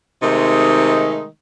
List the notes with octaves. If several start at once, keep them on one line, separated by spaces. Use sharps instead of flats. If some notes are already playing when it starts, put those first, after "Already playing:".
C3 D#3 G#3 A3 D#4